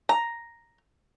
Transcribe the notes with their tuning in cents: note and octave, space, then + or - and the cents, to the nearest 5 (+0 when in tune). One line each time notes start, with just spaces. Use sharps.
A#5 +0